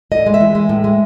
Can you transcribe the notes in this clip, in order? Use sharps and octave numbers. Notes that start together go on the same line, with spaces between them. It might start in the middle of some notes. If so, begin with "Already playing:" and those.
A2 D#5
G#3
E5
E3
G#3
A2
G#3